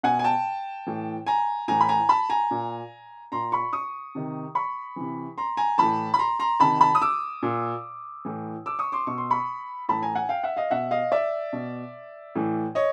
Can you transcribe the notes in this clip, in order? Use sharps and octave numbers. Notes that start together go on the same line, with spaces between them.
B2 F#5 G#5
G#5
G5 A5
A2 E3
G#5 A#5
A2 E3 G#5 A#5
B5
G#5 A#5
A5 B5
G#5 A#5
A#2
A#2 A#5 C6
B5 C#6
C#6 D#6
C3 D#3
B5 C#6
C3 E3
A#5 C6
G#5 A#5
A2 E3 A5 B5
B5
A#5 C6
A#5 C6
C3 D#3 A5 B5
A5 B5
D#6
D6 E6
A#2
A2 E3
D6 E6
C#6 D#6
C6 D6
B2 C#6
C6
B5 C#6
A2 E3 A5 B5
G#5 A#5
F#5 G#5
F5 G5
E5 F#5
D#5 F5
B2 E5 F#5
D#5 F5
D5 E5
B2
A2 E3
C#5 D#5